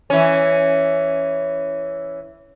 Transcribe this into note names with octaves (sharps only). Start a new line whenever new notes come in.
E3 C#4